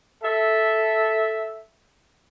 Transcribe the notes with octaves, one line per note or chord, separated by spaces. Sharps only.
A4 E5